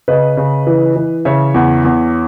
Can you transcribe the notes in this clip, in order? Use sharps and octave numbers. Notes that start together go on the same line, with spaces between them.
C#3 B4 D#5
C#3
E3
E3
C#3 C#5 E5
E2
E2